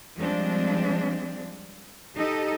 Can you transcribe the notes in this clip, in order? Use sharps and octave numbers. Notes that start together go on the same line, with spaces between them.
F3 G3 G#3 C4 D4
D#4 G4 A4 D#5